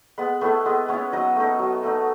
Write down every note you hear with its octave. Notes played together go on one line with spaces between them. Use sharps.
G#3 B3 B4
A3 B3 E4 A4
G#3 B3 B4
B3 C#4 E4 C#5
F#3 D#4 D#5
A3 D#4
F#3
A3 D#4